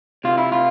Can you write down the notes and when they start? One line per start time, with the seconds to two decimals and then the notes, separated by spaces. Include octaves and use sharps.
0.24 C3 F4
0.38 E4
0.52 F4